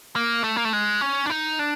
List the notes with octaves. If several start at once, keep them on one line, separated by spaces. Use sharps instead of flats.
A#3
A3
A#3
A3
G#3
C#4
D4
D#4
D4